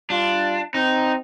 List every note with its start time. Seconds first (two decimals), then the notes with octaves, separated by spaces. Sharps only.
0.10 G3 D4 F4
0.74 C4 D#4